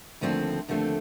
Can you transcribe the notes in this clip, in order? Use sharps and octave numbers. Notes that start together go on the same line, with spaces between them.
D#2 D3 F3 A3 C4
D#2 D3 F3 A3 C4